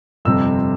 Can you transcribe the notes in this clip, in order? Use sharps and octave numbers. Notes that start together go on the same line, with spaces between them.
G1 F2 C3 G3 C4 E6